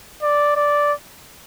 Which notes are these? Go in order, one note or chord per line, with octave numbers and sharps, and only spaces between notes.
D5
D5